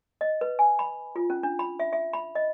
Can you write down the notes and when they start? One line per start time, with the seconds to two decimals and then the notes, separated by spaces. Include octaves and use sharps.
0.21 D#5
0.41 B4
0.59 G#5
0.79 B5
1.16 F4
1.30 C#4
1.43 D4
1.59 B5
1.79 E5
1.93 E5
2.13 B5
2.35 D#5